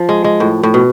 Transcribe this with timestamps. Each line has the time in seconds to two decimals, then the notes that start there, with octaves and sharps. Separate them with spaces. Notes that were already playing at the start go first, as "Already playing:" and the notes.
Already playing: F3
0.09 G#3
0.24 G#3
0.40 A2
0.63 A2
0.74 B2